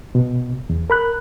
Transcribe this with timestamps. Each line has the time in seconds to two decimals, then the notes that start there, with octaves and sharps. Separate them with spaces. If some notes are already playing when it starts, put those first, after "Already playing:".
0.15 B2
0.70 E2
0.90 A#4 B5 F#6